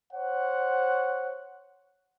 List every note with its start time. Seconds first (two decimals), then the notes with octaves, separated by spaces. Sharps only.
0.14 C5 C#5 F#5